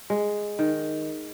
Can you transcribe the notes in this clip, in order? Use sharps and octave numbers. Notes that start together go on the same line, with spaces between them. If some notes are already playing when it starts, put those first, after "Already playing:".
G#3
D#3